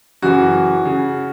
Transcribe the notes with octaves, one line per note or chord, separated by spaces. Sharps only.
F#2 C#3 E3 F#4
C#3